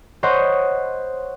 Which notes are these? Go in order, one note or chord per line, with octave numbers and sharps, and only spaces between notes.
C5 C#5 D#5 F#5 B5